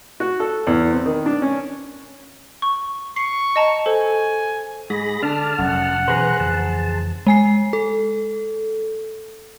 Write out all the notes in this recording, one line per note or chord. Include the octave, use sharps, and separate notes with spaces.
F#4
A4
E2
C4
D#3
D4
C#4
C#6
C#6 C7
D#5 A5 A#5
A4 C5 G#5
G#2 G#4 B5 A#6
D3 D4 A5 F6
F1 F#2 F#3 F#5
B2 E3 G#4 B4 C5 A#5 F#6
F2 C#3 E3 A5
G#3 G#5 C7
A4